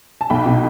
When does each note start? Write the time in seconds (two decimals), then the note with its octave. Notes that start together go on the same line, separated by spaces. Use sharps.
0.21 A5
0.30 B1 G5 B5
0.46 B2